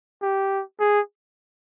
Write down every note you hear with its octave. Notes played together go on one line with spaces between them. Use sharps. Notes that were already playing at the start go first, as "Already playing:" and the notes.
G4
G#4